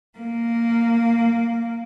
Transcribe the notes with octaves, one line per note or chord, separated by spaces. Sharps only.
A#3